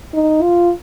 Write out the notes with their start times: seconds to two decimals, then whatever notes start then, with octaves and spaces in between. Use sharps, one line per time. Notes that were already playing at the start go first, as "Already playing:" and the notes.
0.14 D#4
0.42 F4